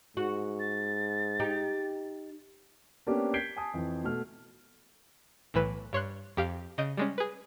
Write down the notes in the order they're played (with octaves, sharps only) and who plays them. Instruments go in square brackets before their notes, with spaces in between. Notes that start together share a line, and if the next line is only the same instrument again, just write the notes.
[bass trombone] G#2 [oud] F#4
[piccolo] A6
[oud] D#4 G4
[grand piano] A#3 B3 C#4 D4 G4
G6 G#6 B6 C7 D7 G7
G#5 A5 D#6
F2 E3
B2 A3 F6
[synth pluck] B1 A2 E3 B4 E7
G2 C#5 C6 F#6
F2 G4 F5 D6
C#3 D#5 G6 D7 D#7
G3 G#3 C#4
G#4 B4